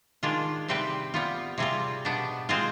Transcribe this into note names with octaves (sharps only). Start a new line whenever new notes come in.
D#3 G#3 D4 F4
C3 G3 C4 G4 B4
G3 B3 F4
C3 G3 C4 F4 G#4
B2 B3 D4
G#3 C4 F4 G#4 C5